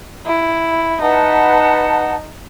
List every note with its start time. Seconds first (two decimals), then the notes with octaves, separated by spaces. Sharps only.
0.26 E4
1.01 D#4 B4 F#5 A5